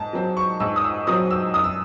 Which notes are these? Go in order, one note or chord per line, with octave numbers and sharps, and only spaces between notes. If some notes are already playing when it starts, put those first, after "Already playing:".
Already playing: G#2 A5
F#3 C4
C#6
G#2 E6
D#6
E6
F#3 C4 D#6
E6
F#2 D#6
E6